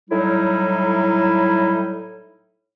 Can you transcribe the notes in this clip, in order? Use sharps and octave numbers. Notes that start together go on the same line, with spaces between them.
A2 F#3 G3 D#4 E4